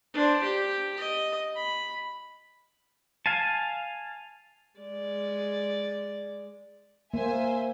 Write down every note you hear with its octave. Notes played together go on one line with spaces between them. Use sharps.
D4 C5
G4
D#5
B5
F5 G#5 A5
G#3 D5
A#3 C5 E5 G#5